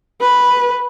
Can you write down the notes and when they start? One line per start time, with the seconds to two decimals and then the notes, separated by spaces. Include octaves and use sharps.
0.21 B4